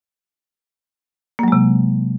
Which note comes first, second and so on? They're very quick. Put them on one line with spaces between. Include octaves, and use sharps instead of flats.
A#3 F#3 G#3 C3